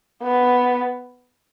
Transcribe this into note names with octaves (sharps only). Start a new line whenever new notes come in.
B3